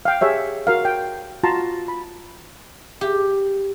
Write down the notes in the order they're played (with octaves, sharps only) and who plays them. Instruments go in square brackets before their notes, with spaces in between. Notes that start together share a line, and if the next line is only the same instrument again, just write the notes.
[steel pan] F5 G5
G4 G#4 C#5 E5
F#4 A#4 F5
G5
F4 F#4 A5 A#5 C6
B5
[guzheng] G4